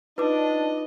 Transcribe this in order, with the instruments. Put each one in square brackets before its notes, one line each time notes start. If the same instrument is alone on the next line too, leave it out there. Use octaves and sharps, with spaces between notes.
[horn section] D4 [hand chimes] D#4 F4 D6 [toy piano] B4 [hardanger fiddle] D#5